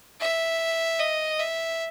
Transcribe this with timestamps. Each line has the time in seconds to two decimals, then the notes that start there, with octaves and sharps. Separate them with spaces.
0.20 E5
0.99 D#5
1.40 E5